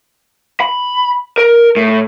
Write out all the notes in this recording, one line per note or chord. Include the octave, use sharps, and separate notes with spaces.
B5
A#4
A2